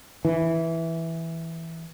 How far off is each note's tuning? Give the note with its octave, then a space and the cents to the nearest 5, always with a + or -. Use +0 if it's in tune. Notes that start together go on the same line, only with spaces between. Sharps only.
E3 -5